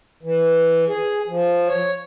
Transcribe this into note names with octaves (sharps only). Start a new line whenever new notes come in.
E3
G#4
F3
C#5